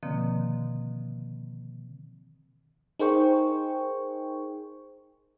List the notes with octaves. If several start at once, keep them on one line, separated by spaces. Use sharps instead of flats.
B2 D3 D#3 F3 A#3 C4
D#4 G#4 A#4 C5 G5 C#6